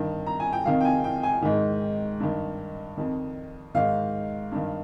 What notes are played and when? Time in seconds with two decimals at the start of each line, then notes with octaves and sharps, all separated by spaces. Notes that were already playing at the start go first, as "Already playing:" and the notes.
Already playing: G2 D#3
0.26 A#5
0.40 G#5
0.53 G5
0.65 F2 C3 D#3 F5
0.80 G5
0.85 G#5
1.04 G5
1.23 G#5
1.42 G#2 D#3
2.20 G2 D#3
2.97 F2 D#3
3.75 G#2 D#3 F5
4.52 G2 D#3